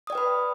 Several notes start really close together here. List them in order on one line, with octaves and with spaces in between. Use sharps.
D#6 D5 G5 B4 B5